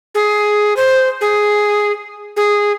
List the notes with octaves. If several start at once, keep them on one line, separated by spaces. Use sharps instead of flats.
G#4
C5
G#4
G#4